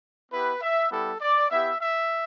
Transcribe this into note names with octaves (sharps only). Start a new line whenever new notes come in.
B3 E4 G4 B4
E5
G3 B3 E4 G4 A4
D5
B3 E4 G4 E5
E5